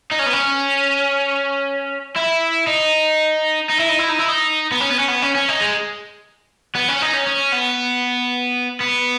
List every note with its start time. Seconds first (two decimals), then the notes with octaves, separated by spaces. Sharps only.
0.11 D#4
0.19 C#4
0.26 B3
0.33 C#4
2.16 E4
2.67 D#4
3.69 D#4
3.80 E4
3.89 D#4
3.99 E4
4.09 D#4
4.19 E4
4.29 D#4
4.71 B3
4.80 C#4
4.90 B3
4.99 C#4
5.08 B3
5.22 C#4
5.35 C#4
5.48 D#4
5.61 G#3
6.75 B3
6.89 C#4
7.02 D#4
7.14 C#4
7.27 C#4
7.52 B3
8.80 B3